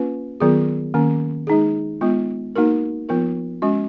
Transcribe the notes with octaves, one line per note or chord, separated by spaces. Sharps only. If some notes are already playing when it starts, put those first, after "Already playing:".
Already playing: A#3 C#4 F4 B4
D#3 F#3 B3 F4 G#4
D#3 A#3 C#4
G#3 D#4 G#4
G#3 B3 F4
A#3 D#4 F#4 A#4
F3 B3 F4 A#4
G#3 C#4 F#4